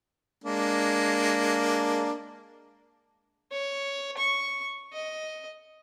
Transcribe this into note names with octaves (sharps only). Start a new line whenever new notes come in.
G#3 A#3 D4
C#5
C#6
D#5